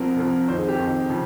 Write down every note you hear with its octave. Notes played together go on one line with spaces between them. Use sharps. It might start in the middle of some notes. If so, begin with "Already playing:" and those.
Already playing: C2 C3 F3 A#4
C2 C3 F3
F2 D#3 C5
G#4
G4
F2 D#3
C#3 F3